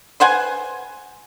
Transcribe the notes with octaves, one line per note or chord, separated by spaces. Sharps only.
B4 C5 F#5 G#5